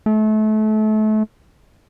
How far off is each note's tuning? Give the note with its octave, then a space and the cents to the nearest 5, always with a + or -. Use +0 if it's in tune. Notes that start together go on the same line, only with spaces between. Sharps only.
A3 -30